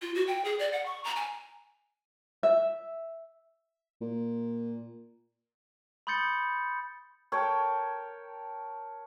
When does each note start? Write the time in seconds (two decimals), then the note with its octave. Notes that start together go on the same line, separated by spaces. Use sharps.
0.02 F4
0.15 F#4
0.27 G5
0.45 G#4
0.59 D5
0.72 F#5
0.86 C#6
1.04 A#5
1.16 G#5
2.43 E5
4.01 A#2
6.07 B5 C6 D#6 G6 A6 C#7
7.32 A#4 C#5 G5 A5